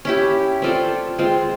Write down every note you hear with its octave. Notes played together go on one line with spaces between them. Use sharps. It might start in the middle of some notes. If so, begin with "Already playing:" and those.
C#4 E4 G4
C4 F4 A4 D5
G#3 C4 F4